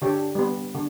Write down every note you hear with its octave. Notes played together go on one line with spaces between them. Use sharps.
D3 G4 A4 C#5
G3 B3
D3